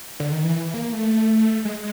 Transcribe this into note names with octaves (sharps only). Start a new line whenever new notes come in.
D3
D#3
E3
E3
A#3
A3
G#3